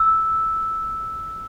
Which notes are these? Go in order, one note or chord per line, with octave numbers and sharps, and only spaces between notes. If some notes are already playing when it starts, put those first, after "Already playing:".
Already playing: E6